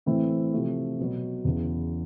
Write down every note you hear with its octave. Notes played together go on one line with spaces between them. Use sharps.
A2 E3 A3 C4 E4
C3 F3 A3
B2 F#3 B3
E2 C#3 E3